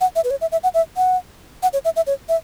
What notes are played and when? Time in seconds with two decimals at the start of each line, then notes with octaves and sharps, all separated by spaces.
0.01 F#5
0.16 E5
0.24 B4
0.30 C#5
0.41 E5
0.52 E5
0.63 F#5
0.74 E5
0.97 F#5
1.63 F#5
1.73 C#5
1.85 E5
1.96 E5
2.07 C#5
2.29 E5